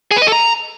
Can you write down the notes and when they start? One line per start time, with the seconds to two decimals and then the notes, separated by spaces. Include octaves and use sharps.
0.11 G#4
0.16 B4
0.22 D#5
0.27 A4
0.32 A#5